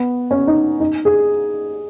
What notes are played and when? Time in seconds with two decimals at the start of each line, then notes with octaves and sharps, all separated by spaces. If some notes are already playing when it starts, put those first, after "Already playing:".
Already playing: B3
0.31 C#4
0.47 D#4
0.80 D#4
1.05 G#4